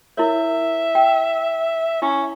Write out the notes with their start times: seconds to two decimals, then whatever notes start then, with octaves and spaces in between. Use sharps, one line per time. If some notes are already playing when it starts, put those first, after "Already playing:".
0.17 E4 A#4 C#5 E5
0.95 G5
2.02 C#4 E4